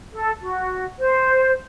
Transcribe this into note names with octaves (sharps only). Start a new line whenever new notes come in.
A4
F#4
C5